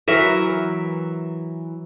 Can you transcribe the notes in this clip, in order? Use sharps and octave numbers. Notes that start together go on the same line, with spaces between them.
E3 F#3 A#4 E5